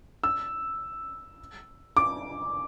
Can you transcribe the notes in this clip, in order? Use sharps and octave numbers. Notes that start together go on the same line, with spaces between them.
E6
D6